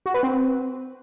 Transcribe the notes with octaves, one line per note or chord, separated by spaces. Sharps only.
F#4
B4
C4